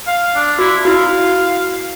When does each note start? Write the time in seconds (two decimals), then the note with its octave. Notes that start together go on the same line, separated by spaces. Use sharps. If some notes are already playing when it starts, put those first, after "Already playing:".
0.07 F5
0.35 D4
0.59 E4 F#4
0.85 E4 F#4 F5